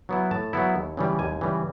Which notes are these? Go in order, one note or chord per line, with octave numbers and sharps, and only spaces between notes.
F#3 B3 E4
A2 A5
F#3 B3 E4
D#2
C#3 E3 G3
D#2 G#5
C#3 E3 G3